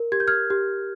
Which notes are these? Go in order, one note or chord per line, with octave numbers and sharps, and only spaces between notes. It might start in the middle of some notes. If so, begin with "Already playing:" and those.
Already playing: A#4
G4 G#6
G6
F6 G#6
G4